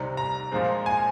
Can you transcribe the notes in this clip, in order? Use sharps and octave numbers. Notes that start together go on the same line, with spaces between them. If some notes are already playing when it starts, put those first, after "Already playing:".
Already playing: C2 C3 G3 C4 D#4 A#5
A#5
A#2 F3 G#3 C4
G#5